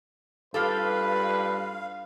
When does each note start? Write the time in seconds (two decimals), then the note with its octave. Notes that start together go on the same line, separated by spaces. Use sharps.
0.54 G2 F4 G4 A4 B4 F5